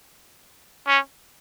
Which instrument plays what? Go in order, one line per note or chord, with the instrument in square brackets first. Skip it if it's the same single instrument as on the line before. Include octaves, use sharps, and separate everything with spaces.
[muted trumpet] C#4